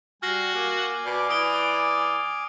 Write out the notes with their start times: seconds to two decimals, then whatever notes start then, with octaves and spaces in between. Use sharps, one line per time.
0.22 G3 F#4 G#5 F6 A#6 C7
0.55 A#3 G#5 D6 F6
1.06 B2 D5
1.29 E3 D#6 D7 G7